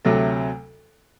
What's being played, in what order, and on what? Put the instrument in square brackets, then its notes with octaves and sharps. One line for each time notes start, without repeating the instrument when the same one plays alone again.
[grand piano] D2 C3 F#3 A3